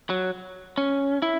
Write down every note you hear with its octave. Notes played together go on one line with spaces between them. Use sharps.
F#3
C#4
E4